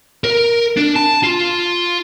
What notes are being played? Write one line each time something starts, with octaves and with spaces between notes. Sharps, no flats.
A#4
D4
A5
F4